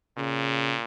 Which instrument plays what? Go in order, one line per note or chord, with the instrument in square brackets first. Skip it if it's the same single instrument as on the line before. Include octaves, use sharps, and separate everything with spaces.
[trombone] A#2 [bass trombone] C#3